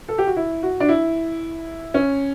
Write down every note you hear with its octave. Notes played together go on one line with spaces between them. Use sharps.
A4
G4
F#4
E4
F#4
D4
E4
C#4